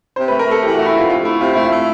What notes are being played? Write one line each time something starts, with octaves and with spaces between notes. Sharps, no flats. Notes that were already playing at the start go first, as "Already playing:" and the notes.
C3 C5
B4
A3
A#4
A3 A4
E3 G4
F#4
A3
E4
F2 F4
C3 F4
A3 E4
C3 F4
A3 E4
F4
A3